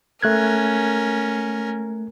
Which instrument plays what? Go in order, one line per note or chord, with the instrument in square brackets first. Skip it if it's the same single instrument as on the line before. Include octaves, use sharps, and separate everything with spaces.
[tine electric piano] A3 F#6 G#6 [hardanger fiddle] C#4 A#4